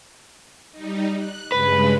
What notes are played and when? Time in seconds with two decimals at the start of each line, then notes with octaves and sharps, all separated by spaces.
0.72 G3 D#4
1.15 F#6
1.52 G2 C#3 G#3 B4